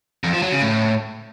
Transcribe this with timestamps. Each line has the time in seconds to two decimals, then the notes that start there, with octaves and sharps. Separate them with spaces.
0.24 F2
0.33 F3
0.42 F#3
0.52 C#3
0.61 A2